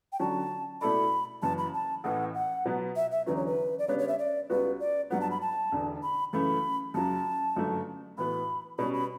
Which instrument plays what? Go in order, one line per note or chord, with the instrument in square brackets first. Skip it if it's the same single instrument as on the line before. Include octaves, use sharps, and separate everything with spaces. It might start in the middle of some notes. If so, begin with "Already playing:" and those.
[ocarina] G5
[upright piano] D3 F#3 C#4 F#4 [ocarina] A5
[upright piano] B2 A3 E4 A4 D5 [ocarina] B5
[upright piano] F#1 F#2 E3 [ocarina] A5
[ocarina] B5
A5
[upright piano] A1 A2 E3 [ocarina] F#5
[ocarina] F#5
[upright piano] B2 F#3 B3
[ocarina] E5
E5
[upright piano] E2 D3 F#3 C#4 [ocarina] B4
[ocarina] C#5
B4
D5
[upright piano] C#3 G3 B3 D4 [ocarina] C#5
[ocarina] C#5
E5
D5
[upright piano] C#2 C#3 G3 B3 F#4 [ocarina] B4
[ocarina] D5
[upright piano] G2 F#3 B3 [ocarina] F#5
[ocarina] A5
B5
A5
[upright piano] E1 E2 D3
[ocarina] B5
[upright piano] F#2 C#3 E3 A3 [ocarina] B5
[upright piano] F#2 C#3 F#3 [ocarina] A5
[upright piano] G1 F#2 C#3 F#3 A3
[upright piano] A2 E3 B3 F#4 B4 [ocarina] B5
[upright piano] B2 G3 C#4 [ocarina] B5
[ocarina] B5